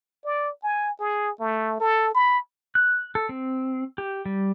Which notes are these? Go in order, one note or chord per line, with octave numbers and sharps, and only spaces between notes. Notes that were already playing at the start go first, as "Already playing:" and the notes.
D5
G#5
G#4
A3
A4
B5
F#6
A4
C4
G4
G3